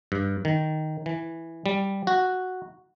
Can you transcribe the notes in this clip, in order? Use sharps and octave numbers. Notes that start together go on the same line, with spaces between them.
G2
D#3
E3
G3
F#4